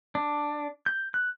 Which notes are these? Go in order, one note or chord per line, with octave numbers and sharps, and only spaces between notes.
D4
G6
F#6